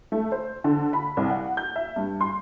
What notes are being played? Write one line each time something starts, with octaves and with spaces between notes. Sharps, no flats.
A3
C5
D3
B5
C2
F#5
G6
E5
G2
C6